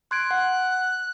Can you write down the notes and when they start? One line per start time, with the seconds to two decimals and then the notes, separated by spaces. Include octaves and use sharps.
0.11 C6 F#6 G#6 D7
0.31 F#5